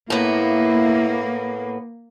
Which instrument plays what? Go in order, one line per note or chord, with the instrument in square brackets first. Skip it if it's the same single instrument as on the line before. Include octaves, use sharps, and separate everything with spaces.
[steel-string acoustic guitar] A2 B3 [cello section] A#3 [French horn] E4